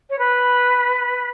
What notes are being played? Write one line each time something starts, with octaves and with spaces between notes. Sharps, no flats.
C#5
B4